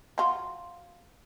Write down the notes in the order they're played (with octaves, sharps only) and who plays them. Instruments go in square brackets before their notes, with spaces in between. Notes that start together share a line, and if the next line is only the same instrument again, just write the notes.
[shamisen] F#3 F4 F#4